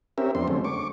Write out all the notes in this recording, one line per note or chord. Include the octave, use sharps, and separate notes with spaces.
C4 C#4 G4 A#4 E5
F2 B3 D4 C6
D3 F#3 G#3 A3 C4 C#4
C#6 D6